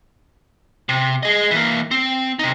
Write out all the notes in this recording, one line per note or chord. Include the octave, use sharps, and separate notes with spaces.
C3
G#4 D#5
E3 A#3
C4
C3 D#4